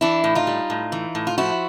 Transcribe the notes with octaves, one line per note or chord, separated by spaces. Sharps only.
E3 D4 E4
A2
D#4 F4
G3
A2
E3
A2
F4
F3 E4 F#4